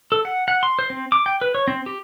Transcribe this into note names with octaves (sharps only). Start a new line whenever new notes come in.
A4
F#5
F#5
C6
C5
C4
D6
G5
B4
C#5
C4
G4